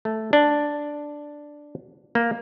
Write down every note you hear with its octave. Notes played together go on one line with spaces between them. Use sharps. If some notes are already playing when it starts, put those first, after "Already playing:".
A3
D4
A#3